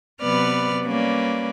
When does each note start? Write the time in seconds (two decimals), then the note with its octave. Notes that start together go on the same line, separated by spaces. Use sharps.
0.23 C3 F#3 B3 B4 D5 F6
0.86 G3 A#3 C#4 B4 D5